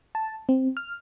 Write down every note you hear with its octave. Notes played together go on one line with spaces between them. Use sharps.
A5
C4
F6